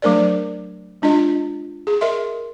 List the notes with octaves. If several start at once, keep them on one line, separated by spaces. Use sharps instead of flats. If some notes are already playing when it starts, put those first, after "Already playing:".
F#3 A3 D4 A#4 C5 D5
G#3 D4 F4 D#5
G#4
A#4 D#5 E5 C6